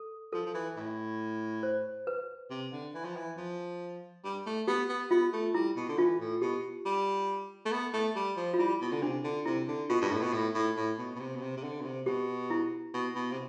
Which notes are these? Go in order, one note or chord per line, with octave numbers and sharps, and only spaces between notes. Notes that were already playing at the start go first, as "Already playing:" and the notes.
Already playing: A4
F3 A4
F3
E3
A2
C5
B4
C3
D3
E3
F3
E3
F3
G3
A3
B3 G4
B3
B3 F4
A3
G3 E4
B2
D3
E3 F4
A2
B2 G4
G3
A3
B3
A3
G3
F3
F4
G3 E4
B2
D3
C3 D4
D3
C3 E4
D3
B2 F4
G2
A2
B2
A2
A2
A2
B2
B2
C3
B2
C3
C3
D3
B2
C3
B2 G4
E4
B2
B2
C3